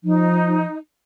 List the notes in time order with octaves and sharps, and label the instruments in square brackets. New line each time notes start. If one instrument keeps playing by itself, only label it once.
[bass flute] F3 [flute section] D#4